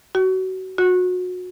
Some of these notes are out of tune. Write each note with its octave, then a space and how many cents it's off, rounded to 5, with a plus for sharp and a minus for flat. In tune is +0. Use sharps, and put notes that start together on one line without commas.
F#4 +25
F#4 -30